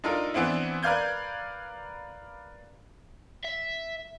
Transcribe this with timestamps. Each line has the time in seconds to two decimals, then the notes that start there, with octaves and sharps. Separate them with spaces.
0.04 D4 D#4 F4 A4 A#4
0.34 E3 B3 C4 D4 E4
0.83 A#4 B4 D5 F5 G6 G#6
3.44 E5